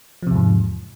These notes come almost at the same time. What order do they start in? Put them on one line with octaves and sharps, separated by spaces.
F3 C3 E2 G#2